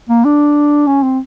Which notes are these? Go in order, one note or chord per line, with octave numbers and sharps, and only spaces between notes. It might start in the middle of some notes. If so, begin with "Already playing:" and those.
A#3
D4
C#4
C4